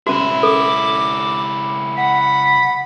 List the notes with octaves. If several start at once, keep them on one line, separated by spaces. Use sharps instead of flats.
C#2 C#4 E4 F#4
A4 D6
F#5 B5